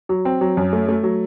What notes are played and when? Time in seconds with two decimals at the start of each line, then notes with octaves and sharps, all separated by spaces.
0.09 F#3
0.25 C4
0.41 F#3
0.57 F#2
0.73 A3
0.89 A3
1.03 F#3